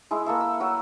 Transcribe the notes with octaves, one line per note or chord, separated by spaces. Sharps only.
G#3 E4
A#3 A4 E5
E6
F#3 F#4